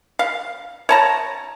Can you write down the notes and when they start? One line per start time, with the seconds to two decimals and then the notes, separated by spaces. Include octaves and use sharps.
0.19 F5
0.89 C#5 A5 A#5